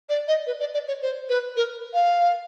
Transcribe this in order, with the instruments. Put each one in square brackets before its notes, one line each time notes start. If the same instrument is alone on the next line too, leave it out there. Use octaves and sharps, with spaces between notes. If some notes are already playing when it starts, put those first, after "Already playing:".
[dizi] D5
D#5
B4
D5
D5
C#5
C5
B4
A#4
F5